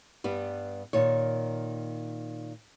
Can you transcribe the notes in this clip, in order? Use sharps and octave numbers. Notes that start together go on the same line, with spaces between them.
G2 G3 B3
A#2 D#3 C#5